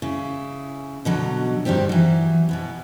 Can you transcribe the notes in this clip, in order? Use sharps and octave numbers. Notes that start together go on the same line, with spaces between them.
C#3 E4
B2 D3 F#3
G2 D#3 G3 C4 G4
E3 F#3
B2 E3 B3